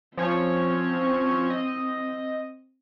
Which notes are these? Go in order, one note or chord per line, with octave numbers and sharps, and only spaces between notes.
F3 C4 C#4 C#5
D#5